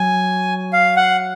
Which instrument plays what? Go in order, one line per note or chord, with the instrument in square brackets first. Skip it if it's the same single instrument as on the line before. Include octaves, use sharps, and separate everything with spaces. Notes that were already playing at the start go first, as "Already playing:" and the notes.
Already playing: [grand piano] F#3 [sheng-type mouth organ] G#5
[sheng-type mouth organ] F5
F#5